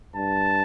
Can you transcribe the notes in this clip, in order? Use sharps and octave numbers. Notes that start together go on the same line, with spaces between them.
G2 A5